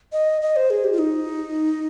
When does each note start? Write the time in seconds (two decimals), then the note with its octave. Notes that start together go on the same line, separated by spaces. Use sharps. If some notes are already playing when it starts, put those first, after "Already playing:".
0.13 D#5
0.42 D#5
0.56 C5
0.70 G#4
0.84 G4
0.92 F4
0.99 D#4